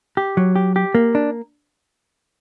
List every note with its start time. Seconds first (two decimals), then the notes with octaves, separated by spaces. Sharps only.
0.17 G4
0.37 F#3
0.56 G4
0.76 G4
0.95 A#3
1.15 D4